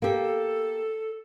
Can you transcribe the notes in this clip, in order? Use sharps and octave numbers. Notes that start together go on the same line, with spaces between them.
A#3 G4 A4